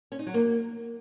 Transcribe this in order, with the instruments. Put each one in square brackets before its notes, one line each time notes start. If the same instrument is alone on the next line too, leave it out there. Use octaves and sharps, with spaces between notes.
[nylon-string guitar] C#4
D#4
F#3
A#3